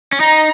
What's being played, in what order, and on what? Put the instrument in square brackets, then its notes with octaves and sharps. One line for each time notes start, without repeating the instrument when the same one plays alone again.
[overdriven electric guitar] C#4
[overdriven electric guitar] D#4 [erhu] A#5